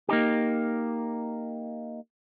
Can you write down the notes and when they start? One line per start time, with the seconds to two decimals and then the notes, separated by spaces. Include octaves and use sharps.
0.09 A#3 D#4 G4